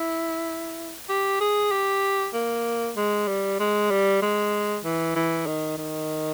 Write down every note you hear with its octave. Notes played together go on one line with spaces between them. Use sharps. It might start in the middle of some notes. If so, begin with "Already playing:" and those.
Already playing: E4
G4
G#4
G4
A#3
G#3
G3
G#3
G3
G#3
E3
E3
D#3
D#3